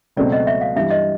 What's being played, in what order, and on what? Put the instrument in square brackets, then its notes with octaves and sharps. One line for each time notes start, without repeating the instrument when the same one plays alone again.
[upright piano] C#2 B2 F#3 A3 C4 [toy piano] D5
[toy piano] D#5
E5
F5
[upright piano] G2 E3 G3 [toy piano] E5
[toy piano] D#5